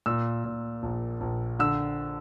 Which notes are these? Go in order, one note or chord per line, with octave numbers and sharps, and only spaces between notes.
A#2 E6
A#2
A#1
A#1
D3 E6